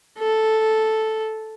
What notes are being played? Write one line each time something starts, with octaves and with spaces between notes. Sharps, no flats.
A4